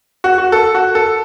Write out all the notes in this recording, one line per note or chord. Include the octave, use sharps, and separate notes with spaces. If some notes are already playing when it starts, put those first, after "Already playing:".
F#4
F#4
A4
F#4
A4